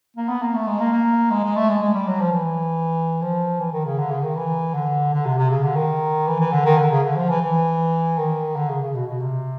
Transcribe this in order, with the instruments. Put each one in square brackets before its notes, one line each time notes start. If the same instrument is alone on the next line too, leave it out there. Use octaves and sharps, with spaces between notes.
[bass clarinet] A#3
B3
A#3
A3
G#3
A#3
A#3
G#3
G#3
A3
G#3
G#3
G3
F#3
F3
E3
F3
E3
D#3
C#3
D3
C#3
D#3
E3
D3
D3
C3
C3
C#3
D3
D#3
E3
E3
D3
D#3
D3
C#3
D3
F3
E3
E3
D#3
D3
C#3
C#3
B2
B2
C3